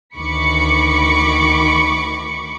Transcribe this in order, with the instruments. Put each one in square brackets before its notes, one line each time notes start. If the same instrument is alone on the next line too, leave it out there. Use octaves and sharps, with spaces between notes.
[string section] D2 D#3 B5 C#6 D6 C#7